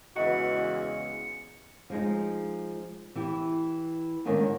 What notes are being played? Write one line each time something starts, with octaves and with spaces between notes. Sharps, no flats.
E2 C#3 E3 G#3 F#4 B4 D#5 C#7
F3 G#3 D#4
E3 E4 G4
G#2 D3 D#3 A#3 C#4